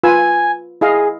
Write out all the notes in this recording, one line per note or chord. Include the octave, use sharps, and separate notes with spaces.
F4 B4 G#5 E6
E4 G#4 D#5 F5